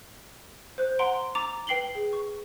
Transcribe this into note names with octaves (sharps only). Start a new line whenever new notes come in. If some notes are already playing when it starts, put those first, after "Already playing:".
C5 F#6
F#5 A#5 C6 D7
A#5 D6 A6 F7
B4 G5 C7 F#7 G7
G#4
C#6